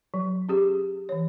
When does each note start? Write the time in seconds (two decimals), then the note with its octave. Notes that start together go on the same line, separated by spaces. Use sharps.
0.14 F#3
0.49 C#4 G4 G#4
1.09 E3 C#5